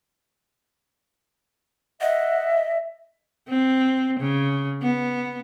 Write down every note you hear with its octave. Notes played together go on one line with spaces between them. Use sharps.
D#5 E5 F#5
C4
C#3
B3